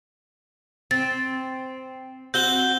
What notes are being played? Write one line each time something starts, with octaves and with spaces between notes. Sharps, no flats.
C4 A6
C4 F#4 F#5 G6 G7